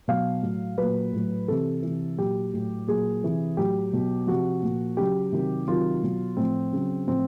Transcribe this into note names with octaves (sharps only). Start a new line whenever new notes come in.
B2 F#3 F5
A2 F#3
A#2 F#3 B4
A2 F#3
C3 E3 A4
C3 E3
A#2 F#3 G4
A2 F#3
A#2 F#3 G#4
C3 E3
A2 F#3 G4
B2 F#3
C3 F3 F#4
A#2 F3
C#3 F#3 G4
C3 D#3 F#3
C3 D#3 F#3 F4
B2 F#3
A2 F3 C4
C#3 F#3
A2 F3 C4